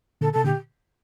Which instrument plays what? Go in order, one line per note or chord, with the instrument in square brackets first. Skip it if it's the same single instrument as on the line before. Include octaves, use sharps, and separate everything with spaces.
[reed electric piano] A#2 D3 [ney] A4
[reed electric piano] C3 [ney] A4
[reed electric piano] A#2 D3 [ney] G4